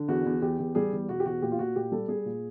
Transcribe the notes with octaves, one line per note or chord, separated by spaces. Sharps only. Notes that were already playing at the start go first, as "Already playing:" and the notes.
Already playing: D3
E2 F#4
E2
E2 G4
E2
G3 G#4
E2
B2 F#4
G4
E2 F#4
A#2 G4
F4
A#2 F#4
A#2 G4
G3 A4
G3 G#4
A#2